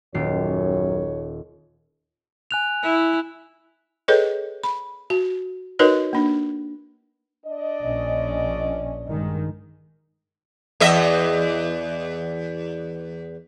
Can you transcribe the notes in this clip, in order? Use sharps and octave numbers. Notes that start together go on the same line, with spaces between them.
D#1 F#2 G4 C#5 C7
G#5 F#6 F7
E4
G#4 A4 B4 C#5 D#5 G5
B5
F#4
D#4 F#4 A#4 B4 C#5 D#5
A#3 D4
D4 D5 D#5
A#1 C#4
G2 D#3 G#3
E2 D#5 E5